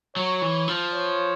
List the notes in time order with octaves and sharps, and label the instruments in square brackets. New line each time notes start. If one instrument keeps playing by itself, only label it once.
[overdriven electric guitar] F#3 [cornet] C#5
[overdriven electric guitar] E3
F3
[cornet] C#5